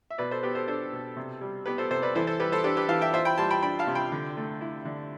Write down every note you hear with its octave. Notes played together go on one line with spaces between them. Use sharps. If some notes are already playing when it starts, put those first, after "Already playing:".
E5
B2 B4 D5
A4 C5
B3 G4 B4
A4 C5
D4 A4 C5
B2
C3
G3
B3 G4 B4
A4 C5
C3 A4 C5
B4 D5
E3 A4 C5
A4 C5
G3 G4 B4
A4 C5
D4 G4 B4
G4 B4
E3 F5 A5
E5 G5
F4 C5 E5
G5 B5
G3 A5 C6
G5 B5
D4 G5 B5
F5 A5
C3
G5 B5
D3
A3
E4
D3